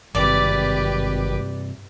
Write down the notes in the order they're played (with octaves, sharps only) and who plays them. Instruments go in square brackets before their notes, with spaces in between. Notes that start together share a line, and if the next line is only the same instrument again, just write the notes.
[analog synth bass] G#1 [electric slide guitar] G2 C3 [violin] G4 B4 [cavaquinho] D5